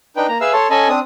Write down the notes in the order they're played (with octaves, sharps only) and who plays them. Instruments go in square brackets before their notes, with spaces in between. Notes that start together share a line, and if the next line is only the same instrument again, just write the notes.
[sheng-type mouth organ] D4 D#4 B4 G5
A#3 A#5
G#4 B4 E5 F5 E6
A4 C#5 A5 C6
C#4 A4 D#5 G#5 A5 B5
C4 D4 D#6